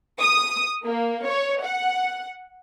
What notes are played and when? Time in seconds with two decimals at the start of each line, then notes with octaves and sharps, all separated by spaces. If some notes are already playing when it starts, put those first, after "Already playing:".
0.20 D#6
0.85 A#3
1.27 C#5
1.64 F#5